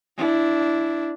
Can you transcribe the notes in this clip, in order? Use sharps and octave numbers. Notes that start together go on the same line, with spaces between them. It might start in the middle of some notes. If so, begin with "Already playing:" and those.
D4 E4